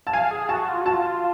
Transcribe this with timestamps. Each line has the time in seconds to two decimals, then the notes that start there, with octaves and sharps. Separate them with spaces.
0.07 A5
0.13 F5 G#5
0.31 G#4
0.49 F#4 A5
0.68 F4
0.81 F#4 A5
0.93 F4